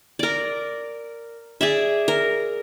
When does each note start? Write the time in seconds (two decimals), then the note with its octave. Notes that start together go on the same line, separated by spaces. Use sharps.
0.19 A#4 D5
1.61 G#4 D5 E5
2.08 A#4